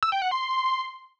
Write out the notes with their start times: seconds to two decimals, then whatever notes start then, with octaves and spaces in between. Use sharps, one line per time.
0.03 E6
0.12 G5
0.22 F#5
0.31 C6